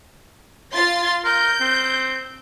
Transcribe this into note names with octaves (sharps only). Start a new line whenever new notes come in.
F4 C6 A6
A#4 G6
C4